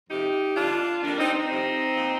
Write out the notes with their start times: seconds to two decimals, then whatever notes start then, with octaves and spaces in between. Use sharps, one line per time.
0.09 F2 C3 F3 D#4 G4
0.56 F2 D3 G3 D4 F4
1.02 F2 D#3 G3 A#3 D4
1.18 C4 D#4
1.33 C4 D#4
1.49 F2 C3 G3
1.95 A#2 F3